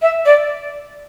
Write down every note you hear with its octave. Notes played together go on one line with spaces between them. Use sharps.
E5
D5